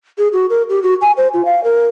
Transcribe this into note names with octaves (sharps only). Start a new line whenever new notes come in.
G#4
F#4
A#4
G4
F#4
G#5
C5
F4
F5
A#4